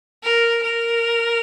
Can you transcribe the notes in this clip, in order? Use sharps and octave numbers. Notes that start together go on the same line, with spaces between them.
A#4
A#4